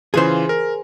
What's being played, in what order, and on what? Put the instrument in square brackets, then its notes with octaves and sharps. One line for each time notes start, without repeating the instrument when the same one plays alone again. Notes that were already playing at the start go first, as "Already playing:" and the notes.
[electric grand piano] C#3 E3 F4 [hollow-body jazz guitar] G#4 C5
[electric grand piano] A#4